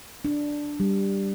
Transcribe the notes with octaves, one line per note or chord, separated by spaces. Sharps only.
D4
G3